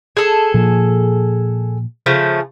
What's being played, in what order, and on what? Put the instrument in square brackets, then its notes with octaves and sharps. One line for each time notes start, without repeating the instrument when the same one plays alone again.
[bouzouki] G#4 A4
[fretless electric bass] A#2 F3
[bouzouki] C#3 F3 A3